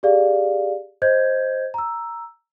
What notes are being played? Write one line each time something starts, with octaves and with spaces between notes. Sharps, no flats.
G4 G#4 D5 F5
C5 D#5 G6 G#6
A#5 E6